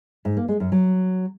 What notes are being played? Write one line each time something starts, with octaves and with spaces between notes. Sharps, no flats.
G#2
A#3
G#3
F#2
F#3